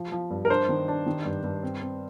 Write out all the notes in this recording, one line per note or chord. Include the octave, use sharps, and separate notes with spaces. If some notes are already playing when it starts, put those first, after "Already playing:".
Already playing: F3
F3
G2
A#4
D4 C5
D#3
D4
D#3
G2
G2
C4
C4